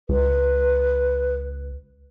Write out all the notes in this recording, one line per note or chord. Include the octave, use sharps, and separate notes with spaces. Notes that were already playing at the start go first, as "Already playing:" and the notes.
C#2 B4